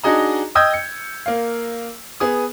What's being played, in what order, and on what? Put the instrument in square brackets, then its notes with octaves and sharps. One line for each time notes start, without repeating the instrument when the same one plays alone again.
[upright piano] D4 D#4 F#4 G#4 D#5 A#5
D#5 G5 D#6 E6 G6 G#6
C#7
A#3 F5
B3 G#4 D#6